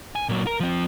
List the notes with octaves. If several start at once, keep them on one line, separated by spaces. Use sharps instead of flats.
G#5
A#2 F#3
A#4
F3 C4